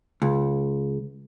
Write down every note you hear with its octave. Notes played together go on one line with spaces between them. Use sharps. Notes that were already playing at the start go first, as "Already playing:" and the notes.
C#2